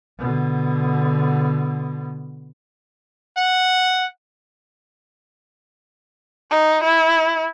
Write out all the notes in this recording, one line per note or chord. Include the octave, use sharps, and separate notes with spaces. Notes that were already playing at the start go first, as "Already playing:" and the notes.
B2 D3
F#5
D#4
E4